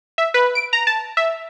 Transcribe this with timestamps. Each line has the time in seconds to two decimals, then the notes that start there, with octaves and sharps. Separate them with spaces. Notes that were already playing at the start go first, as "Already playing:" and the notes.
0.18 E5
0.34 B4
0.55 D7
0.73 A#5
0.87 A5
1.17 E5